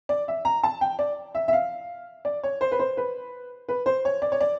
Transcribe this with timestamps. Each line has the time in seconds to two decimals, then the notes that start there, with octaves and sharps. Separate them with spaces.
0.09 D5
0.28 E5
0.45 A#5
0.63 A5
0.81 G5
0.99 D5
1.35 E5
1.48 E5
1.53 F5
2.25 D5
2.43 C#5
2.61 C5
2.72 B4
2.79 C5
2.97 B4
3.69 B4
3.86 C5
4.05 C#5
4.22 D5
4.32 C#5
4.41 D5